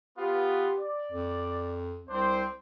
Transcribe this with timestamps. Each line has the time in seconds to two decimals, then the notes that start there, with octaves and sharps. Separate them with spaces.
0.18 B3 F4 G4
0.79 D5
1.12 F2
2.09 C2 C4 D4 C5